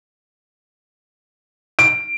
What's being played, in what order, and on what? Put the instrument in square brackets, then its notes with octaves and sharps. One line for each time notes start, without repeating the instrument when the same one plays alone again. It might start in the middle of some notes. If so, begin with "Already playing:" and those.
[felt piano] D7